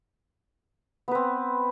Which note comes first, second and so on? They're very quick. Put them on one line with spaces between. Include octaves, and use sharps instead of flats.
B3 B4 C4